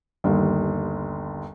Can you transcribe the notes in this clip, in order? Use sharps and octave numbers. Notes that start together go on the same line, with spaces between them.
G1 D#2